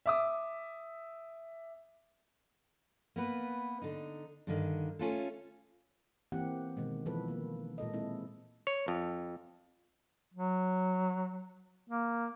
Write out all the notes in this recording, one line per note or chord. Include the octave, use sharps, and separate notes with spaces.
E5 D6 D#6
A#3 B3 B4
D3 D#4
G2 D3 D#3
A3 C#4 F4 A4
E3 A#3 C4 G4 F#5
B2 D#3 G#3
E3 F3 B3 A4 B4
D#3 A#3
A#2 G#3 A4 D#5
G#3 C4 E4 A4
C#5
F2
F#3
A#3